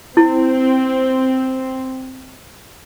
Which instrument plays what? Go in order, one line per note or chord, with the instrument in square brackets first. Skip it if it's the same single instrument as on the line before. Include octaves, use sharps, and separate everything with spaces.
[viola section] C4 [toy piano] E4